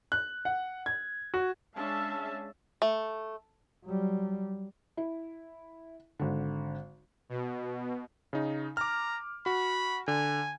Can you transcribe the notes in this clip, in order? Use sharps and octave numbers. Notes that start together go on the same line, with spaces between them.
F#6
F#5
G#6
F#4
G#3 C#4 D4 E5 F5 A5
A3
F#3 G3
E4
G#1 D3
B2
C#3 D#4
A#5 D6 F6
F#4 B5
D3 G#5